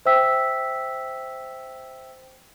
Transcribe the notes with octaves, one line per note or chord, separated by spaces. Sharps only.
C5 E5 G5 E6 B6